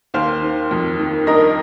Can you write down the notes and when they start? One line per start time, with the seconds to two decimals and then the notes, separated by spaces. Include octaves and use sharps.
0.14 D#2 C5 F5
0.42 D#3
0.71 F2
0.99 D#3
1.26 G2 A#4 D#5